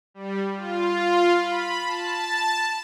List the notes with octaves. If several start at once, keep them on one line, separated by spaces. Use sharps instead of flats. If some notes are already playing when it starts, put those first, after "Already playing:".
G3
F4
B5
A5